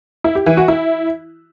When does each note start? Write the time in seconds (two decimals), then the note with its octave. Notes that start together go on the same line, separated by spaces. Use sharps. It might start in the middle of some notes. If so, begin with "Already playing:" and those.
0.24 E4
0.35 G4
0.46 E3
0.57 F#4
0.68 E4